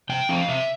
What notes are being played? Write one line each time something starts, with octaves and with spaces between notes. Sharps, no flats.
C3 G5
F3 A3 C4 F5
C3 E5